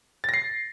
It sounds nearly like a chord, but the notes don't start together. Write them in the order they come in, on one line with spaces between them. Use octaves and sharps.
A6 A#6 C7